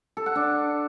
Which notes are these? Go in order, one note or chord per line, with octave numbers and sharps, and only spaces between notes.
A4
F#5
D4